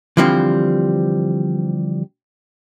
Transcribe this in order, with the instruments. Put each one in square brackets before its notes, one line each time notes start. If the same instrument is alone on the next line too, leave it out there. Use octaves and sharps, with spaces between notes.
[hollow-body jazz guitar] D3 E3 F3 G3 C4